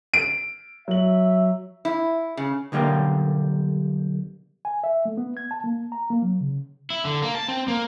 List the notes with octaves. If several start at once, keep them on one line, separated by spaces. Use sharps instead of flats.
D7
F#3 E5 F#7
E4
C#3
B1 D3 G3 A#3 G4
G#5
E5
A3
B3
G#6
A5
A#3
A#5
A#3
F#3
C#3
E4
D3
A#3
A5
C4
A#3